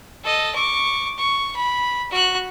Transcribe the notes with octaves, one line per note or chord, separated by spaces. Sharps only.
A4 D#5
C#6 D6
C#6
B5
F#4 F#6